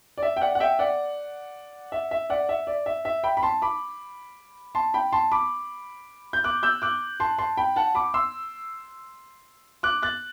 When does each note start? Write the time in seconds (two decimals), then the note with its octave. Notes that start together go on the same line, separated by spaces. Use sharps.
0.18 D5
0.23 E5
0.37 G5
0.41 D5 F#5
0.55 F#5
0.60 E5 G5
0.79 D5 F#5
1.92 E5
2.11 E5
2.30 D5 F#5
2.49 E5
2.67 D5
2.86 E5
3.05 E5
3.24 G5 B5
3.37 B5
3.43 A5 C6
3.62 B5 D6
4.75 A5 C6
4.94 G5 B5
5.13 A5 C6
5.32 B5 D6
6.33 G6
6.44 D6 F#6
6.63 E6 G6
6.82 D6 F#6
7.20 A5 C6
7.38 A5 C6
7.57 G5 B5
7.76 F#5 A5
7.95 B5 D6
8.14 C6 E6
9.83 D6 F#6
10.03 F#6 A6